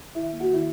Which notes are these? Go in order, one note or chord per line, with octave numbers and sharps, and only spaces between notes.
D#3 E4 E5
A#3
F#4 F#5
D#3 E4 E5